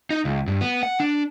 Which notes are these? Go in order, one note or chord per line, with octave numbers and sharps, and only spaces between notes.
D#4
C#2
G2
B3
F#5
D4